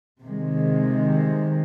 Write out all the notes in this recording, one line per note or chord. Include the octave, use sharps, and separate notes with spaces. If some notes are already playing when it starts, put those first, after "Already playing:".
C3 D#3 G#3